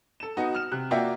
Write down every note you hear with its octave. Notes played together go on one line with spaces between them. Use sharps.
A4 E7
B3 D#4 F#4
F#5 F6 E7
C3 F#6
A#3 F4 F#4 D5 E5 G5